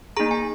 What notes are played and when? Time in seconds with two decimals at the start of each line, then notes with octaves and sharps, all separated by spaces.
0.17 A#3 D#4 G#4 A#5
0.31 G#5